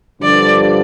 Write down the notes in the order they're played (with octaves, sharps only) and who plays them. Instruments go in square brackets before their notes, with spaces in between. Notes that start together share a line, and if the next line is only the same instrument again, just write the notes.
[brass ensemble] G2 D3 F3 [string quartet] D5